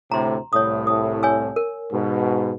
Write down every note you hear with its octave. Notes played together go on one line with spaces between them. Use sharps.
D2 A2 C3 A#5 C6
C2 A2 C#5 D#6
D#6
C#5 G#5 E6
A#4
G#2 B2